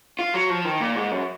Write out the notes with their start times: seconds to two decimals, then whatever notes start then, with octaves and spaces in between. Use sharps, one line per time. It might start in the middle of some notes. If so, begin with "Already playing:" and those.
0.19 F4
0.34 F#3
0.50 F3
0.65 D#3
0.81 A#2
0.96 G#2
1.11 F#2